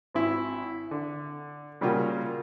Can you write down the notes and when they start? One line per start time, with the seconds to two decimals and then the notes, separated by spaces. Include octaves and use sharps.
0.14 G#1 E4
0.91 D3
1.81 A#2 C#3 G3 A#3 F4 F#4